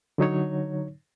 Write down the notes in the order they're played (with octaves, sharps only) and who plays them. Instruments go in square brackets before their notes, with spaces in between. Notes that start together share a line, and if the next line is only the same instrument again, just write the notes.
[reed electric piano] D3 F#3 D#4 C#5